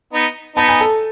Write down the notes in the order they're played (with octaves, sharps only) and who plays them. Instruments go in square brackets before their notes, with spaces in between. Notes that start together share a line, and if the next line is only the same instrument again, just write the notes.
[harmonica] B3 D#4
[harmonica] B3 D#4 [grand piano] A5
[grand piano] G#5
A4 A5